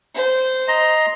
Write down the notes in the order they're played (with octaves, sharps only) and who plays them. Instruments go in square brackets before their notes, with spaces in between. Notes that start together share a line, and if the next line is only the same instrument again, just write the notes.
[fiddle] C5
[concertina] D#5 A#5 C6